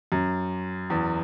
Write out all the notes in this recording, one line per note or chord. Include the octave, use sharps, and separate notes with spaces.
F#2
E2